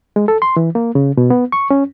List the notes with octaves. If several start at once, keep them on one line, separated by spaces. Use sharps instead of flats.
G#3
A4
C6
E3
A#3
C#3
B2
B3
C#6
C#4